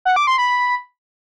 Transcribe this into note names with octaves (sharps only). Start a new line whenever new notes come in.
F#5
D6
C6
B5